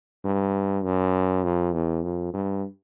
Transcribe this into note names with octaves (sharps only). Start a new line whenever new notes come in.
G2
F#2
F2
E2
F2
G2